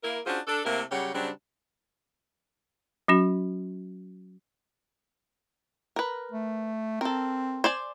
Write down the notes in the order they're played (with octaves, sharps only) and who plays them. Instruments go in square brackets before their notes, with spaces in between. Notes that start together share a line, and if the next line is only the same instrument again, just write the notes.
[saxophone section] A#3 E4 A#4
C#4 D4 F4 F#4 G#4 C5
D4 A4
C3 A3 A#3 E4 G4 A#4
C#3 F#3 G3 G4 C#5 F#5
C#3 F#3 G3 C4 D4
[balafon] F#3 C#4 F#4
[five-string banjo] A#4 B4
[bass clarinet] A3
[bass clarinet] C4 [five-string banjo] A4 A#4
[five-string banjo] C5 D5 G#5